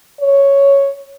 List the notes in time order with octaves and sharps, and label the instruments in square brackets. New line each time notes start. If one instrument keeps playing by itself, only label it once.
[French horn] C#5